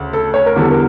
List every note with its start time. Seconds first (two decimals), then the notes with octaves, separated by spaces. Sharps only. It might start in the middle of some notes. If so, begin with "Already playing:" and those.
Already playing: D2 C#3
0.13 A4
0.34 C#5
0.46 A#4
0.56 E2 D3 G3 A4
0.71 A#4